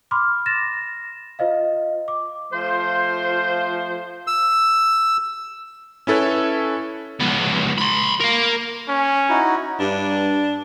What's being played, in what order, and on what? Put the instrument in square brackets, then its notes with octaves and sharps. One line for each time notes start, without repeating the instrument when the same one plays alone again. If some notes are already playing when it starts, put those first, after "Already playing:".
[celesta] B5 C6 D6 F6
A6 A#6 E7
F4 C5 D#5 F5
D6
[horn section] F3 A3 F4 C5
[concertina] E6
[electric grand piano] C#4 E4 A4 B4 C#5
[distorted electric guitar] C#2 B3
B5 C6
A#4 F5
[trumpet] C#4
[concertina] D#4 E4 F#4
[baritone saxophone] G2 [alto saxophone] D4